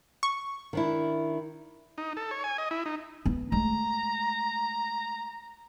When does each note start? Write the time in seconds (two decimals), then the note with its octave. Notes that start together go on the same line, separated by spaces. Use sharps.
0.23 C#6
0.73 D#3 D4 E4
1.98 D#4
2.17 A4
2.31 C#5
2.44 G#5
2.58 D#5
2.71 E4
2.86 D#4
3.26 B3
3.52 G#3 A3 A#5